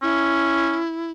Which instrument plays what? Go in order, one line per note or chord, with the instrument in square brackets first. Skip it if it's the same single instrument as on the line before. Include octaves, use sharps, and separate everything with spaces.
[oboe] C#4 [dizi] E4